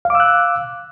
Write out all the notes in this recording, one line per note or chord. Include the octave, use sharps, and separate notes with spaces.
F5 D6 E6 F#6